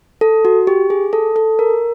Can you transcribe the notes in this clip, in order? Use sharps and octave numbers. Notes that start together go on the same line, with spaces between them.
A4
F#4
G4
G#4
A4
A4
A#4